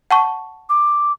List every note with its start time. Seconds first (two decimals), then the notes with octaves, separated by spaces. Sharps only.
0.11 F#5 A5 C#6
0.69 D6